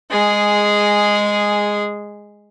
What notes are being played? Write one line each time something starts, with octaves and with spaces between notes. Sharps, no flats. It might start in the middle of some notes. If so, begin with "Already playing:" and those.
G#3 G#4